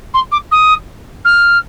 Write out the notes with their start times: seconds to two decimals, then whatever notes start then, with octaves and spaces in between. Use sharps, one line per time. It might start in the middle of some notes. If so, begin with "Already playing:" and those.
0.14 C6
0.31 D6
0.51 D#6
1.24 F6